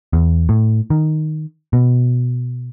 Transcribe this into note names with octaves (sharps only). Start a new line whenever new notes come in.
E2
A2
D#3
B2